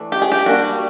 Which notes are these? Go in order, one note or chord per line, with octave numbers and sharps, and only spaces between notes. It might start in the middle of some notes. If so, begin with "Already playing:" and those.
Already playing: E3 A3 D4
G4
G#4
G4
G3 A#3 D4 F#4